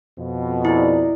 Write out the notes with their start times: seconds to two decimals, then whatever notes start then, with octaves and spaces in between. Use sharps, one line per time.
0.19 F2 B2
0.65 D#4 E4 G#4 D5